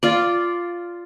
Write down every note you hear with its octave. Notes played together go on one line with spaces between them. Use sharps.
F4 D5